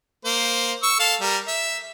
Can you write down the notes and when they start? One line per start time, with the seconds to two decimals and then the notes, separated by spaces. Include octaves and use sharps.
0.25 A#3 C5
0.83 C#6 E6
0.99 A4 F5 A5
1.21 G3 A#4
1.48 E5